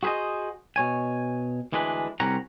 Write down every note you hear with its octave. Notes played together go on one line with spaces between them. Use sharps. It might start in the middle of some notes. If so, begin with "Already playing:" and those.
F#4 G#4 B4 C5 D#5
B2 C#5 G#5
D2 E3 G#3 D4 G#4 B4
C2 G3 C4 C#4 F#5 A#5